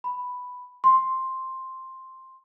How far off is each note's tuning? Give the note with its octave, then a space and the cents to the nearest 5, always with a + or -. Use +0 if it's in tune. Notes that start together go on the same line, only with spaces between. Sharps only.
B5 +5
C6 +5